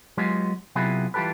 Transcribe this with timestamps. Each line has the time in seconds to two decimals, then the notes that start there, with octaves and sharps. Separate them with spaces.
0.17 F#3 G#3 B3 F4 G4
0.75 C3 F#3 B3 E4 F4 G#4
1.14 E3 G3 F4 G4 A4 B4